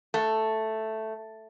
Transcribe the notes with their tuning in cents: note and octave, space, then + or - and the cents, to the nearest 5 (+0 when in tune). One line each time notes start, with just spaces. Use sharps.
A3 +0